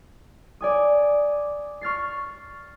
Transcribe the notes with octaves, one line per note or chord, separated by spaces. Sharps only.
D5 G#5 D#6
C#6 F6 A6 C7